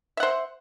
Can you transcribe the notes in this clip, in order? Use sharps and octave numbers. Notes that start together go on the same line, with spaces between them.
C5 E5 F#5